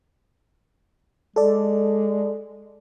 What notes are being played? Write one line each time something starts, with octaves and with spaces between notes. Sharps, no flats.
G#3 A4 D5